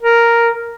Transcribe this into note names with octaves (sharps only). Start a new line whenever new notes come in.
A#4